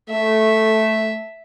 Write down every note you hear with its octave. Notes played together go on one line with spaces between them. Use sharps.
A3 E5